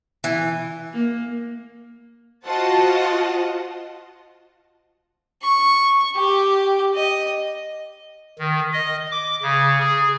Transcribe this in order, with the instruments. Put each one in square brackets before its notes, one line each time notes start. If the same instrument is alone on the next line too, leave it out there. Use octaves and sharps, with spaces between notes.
[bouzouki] E3
[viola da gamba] A#3
[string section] F4 F#4 C5 D#5 F#5 A5
[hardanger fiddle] C#6
G4
D#5
[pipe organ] D#3
D#5
D6
C#3
G#4